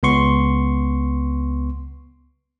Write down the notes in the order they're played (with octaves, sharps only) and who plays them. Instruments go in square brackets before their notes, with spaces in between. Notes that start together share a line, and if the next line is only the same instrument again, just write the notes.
[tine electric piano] C#2 B3 C6 C#6